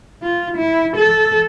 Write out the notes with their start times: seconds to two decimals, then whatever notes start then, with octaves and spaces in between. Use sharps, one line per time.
0.23 F4
0.57 E4
0.96 A4